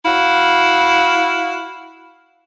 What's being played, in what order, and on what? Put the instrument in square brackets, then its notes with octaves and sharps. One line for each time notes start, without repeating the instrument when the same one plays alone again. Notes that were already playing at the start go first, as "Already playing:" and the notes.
[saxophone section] E4 F#4 F5